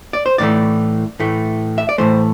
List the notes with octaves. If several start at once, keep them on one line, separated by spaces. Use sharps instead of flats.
D5
C5
A2 E3 A3 D5
A2 E3 A3
E5
D5
A2 E3 A3 C5